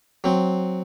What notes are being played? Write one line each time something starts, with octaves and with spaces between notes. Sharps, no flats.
F#3 C4